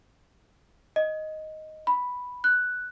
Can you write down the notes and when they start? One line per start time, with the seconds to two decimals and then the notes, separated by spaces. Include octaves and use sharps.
0.96 D#5
1.87 B5
2.44 F#6